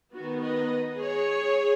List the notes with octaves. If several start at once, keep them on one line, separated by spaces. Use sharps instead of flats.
D#3 B3 F#4
B4 D#5
G#4 C#5